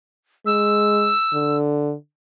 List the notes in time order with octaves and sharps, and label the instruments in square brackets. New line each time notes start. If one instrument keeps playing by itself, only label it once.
[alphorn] G#3 [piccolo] E6
[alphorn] D3